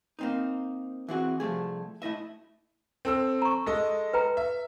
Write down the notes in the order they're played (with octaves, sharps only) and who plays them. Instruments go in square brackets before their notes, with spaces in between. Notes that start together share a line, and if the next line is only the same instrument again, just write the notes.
[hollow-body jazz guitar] A#3 C4 D#4
E3 C4 F#4 G#4
C2 F3 A3 G#4
A3 E4 D#5 E5
[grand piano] C4 A4 E6
[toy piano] A#5 C#6
[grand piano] G#3 A4 D#5
[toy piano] B4 G5 A#5
[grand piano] E5